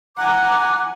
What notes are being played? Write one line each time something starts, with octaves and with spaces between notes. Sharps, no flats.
F#5 G#5 A#5 D6 F#6